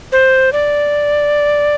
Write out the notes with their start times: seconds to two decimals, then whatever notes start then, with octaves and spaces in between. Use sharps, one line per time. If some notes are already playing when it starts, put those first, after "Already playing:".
0.12 C5
0.53 D5